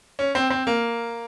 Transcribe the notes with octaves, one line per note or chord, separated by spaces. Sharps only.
C#4
C4
C4
A#3